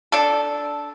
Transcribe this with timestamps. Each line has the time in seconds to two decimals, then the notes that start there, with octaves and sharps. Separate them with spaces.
0.12 D4 A4